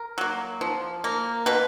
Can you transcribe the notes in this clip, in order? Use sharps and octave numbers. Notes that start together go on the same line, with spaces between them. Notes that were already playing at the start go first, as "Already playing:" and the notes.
Already playing: A#4
F#3 A#3
F3
A#3
B2 B4